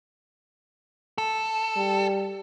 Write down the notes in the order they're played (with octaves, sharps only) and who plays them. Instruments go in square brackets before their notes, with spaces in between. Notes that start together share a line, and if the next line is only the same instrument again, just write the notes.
[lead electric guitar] A4
[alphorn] G3